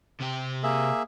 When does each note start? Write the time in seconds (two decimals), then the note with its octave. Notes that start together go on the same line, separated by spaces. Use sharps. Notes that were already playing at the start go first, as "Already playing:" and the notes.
0.20 C3 G4
0.63 A#3 G#4 E5